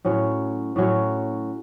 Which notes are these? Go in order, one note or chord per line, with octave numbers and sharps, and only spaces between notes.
A2 F#3 C#4
A2 F#3 C#4